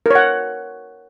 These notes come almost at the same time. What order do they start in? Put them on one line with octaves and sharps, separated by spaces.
A#4 C#5 F#5